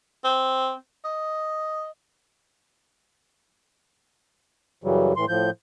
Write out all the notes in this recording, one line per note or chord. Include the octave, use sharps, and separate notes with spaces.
C4
D#5
F#2 C#3 E3 F#3 G3
A2 E3 C6
A2 F3 G6